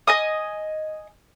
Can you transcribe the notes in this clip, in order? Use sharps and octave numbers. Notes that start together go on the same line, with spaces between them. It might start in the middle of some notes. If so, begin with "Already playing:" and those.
D#5 G#5 D#6